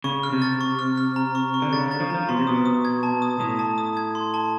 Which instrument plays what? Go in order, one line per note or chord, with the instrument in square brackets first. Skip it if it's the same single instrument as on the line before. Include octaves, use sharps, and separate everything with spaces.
[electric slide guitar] C#3 [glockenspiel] C#6
[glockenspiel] F6
[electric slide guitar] C3
[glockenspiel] A6
C#6
F6
F6
A#5
C#6
C#6
[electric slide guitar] D3
[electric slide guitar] C#3 [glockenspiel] A6
[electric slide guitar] D3
[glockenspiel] A6
[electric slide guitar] F3
[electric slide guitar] F3 [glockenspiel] A#5
[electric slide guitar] B2 [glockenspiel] C6
[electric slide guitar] C3
[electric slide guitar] B2 [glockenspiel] D#6
[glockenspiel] D#6
G#6
A5
D#6
[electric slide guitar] A2 [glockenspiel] D#6
[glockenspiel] A5
D#6
G#6
C6
A5